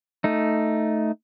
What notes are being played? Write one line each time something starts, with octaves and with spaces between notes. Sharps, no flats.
A3 D#4